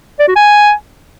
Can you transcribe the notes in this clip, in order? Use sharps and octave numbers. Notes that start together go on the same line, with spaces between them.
D5
F#4
G#5